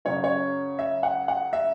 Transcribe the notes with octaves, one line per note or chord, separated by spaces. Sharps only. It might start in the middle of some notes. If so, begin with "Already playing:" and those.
F#2 C#3 F#3 C#4 C#5
C#5
E5
F#5
F#5
E5